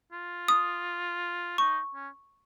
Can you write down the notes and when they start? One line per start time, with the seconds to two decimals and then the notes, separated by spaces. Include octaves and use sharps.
0.12 F4
0.48 D#6
1.58 D#4 C#6
1.95 C#4